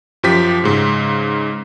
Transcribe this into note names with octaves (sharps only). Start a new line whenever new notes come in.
F#2 F3 G4 B6
G#2 C#3